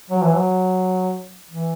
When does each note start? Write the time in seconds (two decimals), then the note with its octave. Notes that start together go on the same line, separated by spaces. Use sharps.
0.10 F#3
0.22 E3
0.34 F#3
1.50 E3